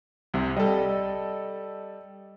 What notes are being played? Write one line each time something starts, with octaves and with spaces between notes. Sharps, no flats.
C2 C3
G3 A4 D#5